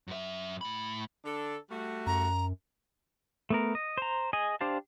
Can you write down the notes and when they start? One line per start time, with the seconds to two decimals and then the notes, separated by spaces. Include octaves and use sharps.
0.08 F#2 E5
0.61 A2 B5
1.25 D3 D4 A4
1.70 G3 A3 F#4
2.06 F#2 A#5
3.50 A3 B3 A#4
3.75 D#5
3.98 C5 A#5
4.33 G#4 D#5 G#5
4.61 D4 G4 C5 F5 A5